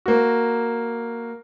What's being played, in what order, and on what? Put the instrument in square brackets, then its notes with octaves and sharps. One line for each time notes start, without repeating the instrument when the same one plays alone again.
[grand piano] A#3 F#4